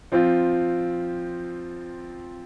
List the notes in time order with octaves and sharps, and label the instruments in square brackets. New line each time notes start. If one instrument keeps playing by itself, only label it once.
[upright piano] F3 C4 F4